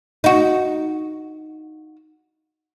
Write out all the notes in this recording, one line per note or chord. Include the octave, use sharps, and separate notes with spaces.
D#4 F#4